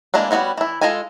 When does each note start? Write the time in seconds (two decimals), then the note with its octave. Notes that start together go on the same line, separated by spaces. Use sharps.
0.14 E3 G#3 A#3 D4
0.31 G3 B3 F4 F#4 C#5
0.58 E3 E4
0.81 G#3 F4 A4 D#5 G#5